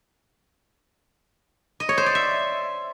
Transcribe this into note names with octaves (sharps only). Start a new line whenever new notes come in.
D#5
C#5
C5
D5
E5